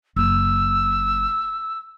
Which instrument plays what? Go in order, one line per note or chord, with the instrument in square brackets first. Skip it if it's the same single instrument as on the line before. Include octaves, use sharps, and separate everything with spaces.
[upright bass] F#1 [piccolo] E6